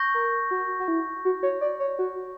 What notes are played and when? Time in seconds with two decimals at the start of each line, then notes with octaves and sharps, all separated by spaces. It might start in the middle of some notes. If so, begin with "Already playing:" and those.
Already playing: C#6 G6 A#6
0.14 A#4
0.51 F#4
0.80 F#4
0.88 E4
1.25 F#4
1.43 C#5
1.61 D5
1.80 C#5
1.99 F#4